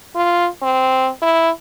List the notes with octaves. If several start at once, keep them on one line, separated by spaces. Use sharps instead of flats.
F4
C4
E4